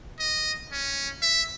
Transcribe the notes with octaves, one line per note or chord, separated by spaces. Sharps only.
D#5
C#4
E5